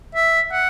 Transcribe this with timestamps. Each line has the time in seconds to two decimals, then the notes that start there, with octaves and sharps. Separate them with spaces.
0.15 E5
0.52 F#5